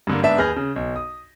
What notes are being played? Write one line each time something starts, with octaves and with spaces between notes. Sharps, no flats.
G2 D3 A#3
G#2 B3 D4 E5 A5 E7
D#2 G#4 B4 F6 G6 A#6
C#3
B1
D#6